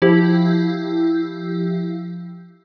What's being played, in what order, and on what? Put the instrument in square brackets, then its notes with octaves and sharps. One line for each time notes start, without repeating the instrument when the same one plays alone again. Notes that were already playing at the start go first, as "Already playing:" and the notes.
[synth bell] F3 E4 G4